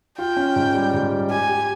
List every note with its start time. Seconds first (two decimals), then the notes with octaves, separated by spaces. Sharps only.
0.18 F4 G5
0.37 C#4
0.56 G#2
0.74 G3
0.94 G#2
1.12 G3
1.30 G4 G#5
1.49 G4